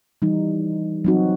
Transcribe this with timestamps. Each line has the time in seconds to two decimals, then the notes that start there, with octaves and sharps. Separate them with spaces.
0.22 E3 G3 D#4
1.05 F#3 C4 D#4 F#4